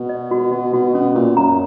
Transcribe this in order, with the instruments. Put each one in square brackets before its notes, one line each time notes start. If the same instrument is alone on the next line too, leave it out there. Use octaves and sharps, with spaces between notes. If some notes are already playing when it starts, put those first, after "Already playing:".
Already playing: [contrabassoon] B2
[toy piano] D#5
F#4
[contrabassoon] B2 [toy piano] D#5
[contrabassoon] B2 [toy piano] F#4
[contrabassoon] B2 [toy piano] C#4
[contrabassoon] A#2 [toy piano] C#4
[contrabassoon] F#2 [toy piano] A#5